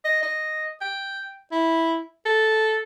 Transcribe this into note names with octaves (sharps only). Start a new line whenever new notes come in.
D#5
D#5
G5
E4
A4